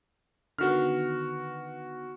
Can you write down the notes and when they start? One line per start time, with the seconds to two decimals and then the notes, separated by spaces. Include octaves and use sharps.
0.59 D3 D#3 B3 F#4 F6